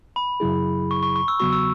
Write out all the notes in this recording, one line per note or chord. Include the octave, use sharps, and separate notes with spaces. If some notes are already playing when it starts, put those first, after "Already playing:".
B5
F#2 C#3 F#3 E4 G#4
C#6
C#6
C#6
E6
E2 C#3 F#3 B3 F#4 C#6
E6